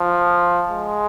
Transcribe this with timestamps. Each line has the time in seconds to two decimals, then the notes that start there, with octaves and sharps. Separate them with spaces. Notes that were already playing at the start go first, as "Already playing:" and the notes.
Already playing: F3
0.71 G#3